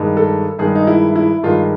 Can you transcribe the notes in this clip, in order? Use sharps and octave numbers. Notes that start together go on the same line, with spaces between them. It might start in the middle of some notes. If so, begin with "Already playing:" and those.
Already playing: G2 D#3 G#3
A4
G2 D#3 G#3 G#4
D#4
E4
E4
G2 D#3 G#3 F4